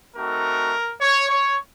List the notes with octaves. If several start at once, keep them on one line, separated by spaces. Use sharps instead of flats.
A3 C4 D#4 F#4 A#4
C#5
C#5